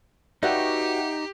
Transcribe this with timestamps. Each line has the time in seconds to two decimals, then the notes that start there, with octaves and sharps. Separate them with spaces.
0.43 D#4 F#4 G4 B4 D5 E5 F#5 G5